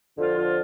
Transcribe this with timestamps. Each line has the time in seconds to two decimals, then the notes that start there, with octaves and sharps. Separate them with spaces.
0.18 F2 D3 F3 F4
0.37 F4